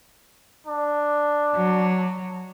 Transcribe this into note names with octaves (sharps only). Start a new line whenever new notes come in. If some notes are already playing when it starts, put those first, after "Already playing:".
D4
F#3